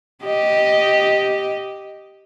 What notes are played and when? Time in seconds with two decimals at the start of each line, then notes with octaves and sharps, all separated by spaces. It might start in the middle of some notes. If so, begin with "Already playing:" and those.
0.24 G4 D#5